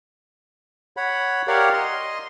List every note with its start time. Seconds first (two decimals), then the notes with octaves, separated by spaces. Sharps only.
0.97 C#5 F#5 B5
1.48 G4 A#4 C#5 D5 F5 F#5
1.73 D#5 C6